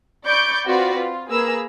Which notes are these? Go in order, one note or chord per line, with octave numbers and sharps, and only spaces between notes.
D5 B5 C#6 G6 D7
C4 F4 F#4 B4 D5 B5
F4
A#3 G#4 B4 A#5 E6